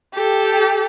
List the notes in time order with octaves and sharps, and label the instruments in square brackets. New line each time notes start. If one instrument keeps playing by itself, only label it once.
[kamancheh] G4 A4